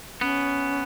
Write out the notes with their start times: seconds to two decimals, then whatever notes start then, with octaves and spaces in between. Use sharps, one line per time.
0.21 B3 C#4